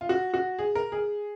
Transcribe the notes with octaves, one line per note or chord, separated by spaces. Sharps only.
F4
F#4
F#4
G#4
A#4
G#4